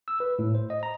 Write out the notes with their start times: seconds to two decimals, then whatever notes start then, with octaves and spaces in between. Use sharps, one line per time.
0.08 E6
0.20 B4
0.39 A2
0.55 C5
0.70 D#5
0.83 A#5